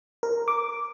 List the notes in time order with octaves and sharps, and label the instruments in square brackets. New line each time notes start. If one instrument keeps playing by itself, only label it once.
[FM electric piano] A#4
D6